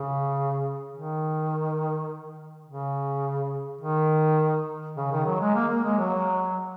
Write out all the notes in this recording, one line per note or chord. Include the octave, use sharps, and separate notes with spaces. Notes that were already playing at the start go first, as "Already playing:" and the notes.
Already playing: C#3
D#3
C#3
D#3
C#3
D#3
F#3
G#3
A#3
A#3
G#3
F#3